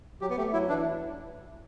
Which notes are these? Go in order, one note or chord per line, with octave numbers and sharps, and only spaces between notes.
F#3 G4
B3
A3 G4
F#3 E4
E3 D4